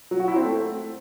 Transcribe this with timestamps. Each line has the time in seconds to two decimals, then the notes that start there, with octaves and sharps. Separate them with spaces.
0.11 F#3
0.20 F#4
0.28 E4
0.36 C4
0.45 A3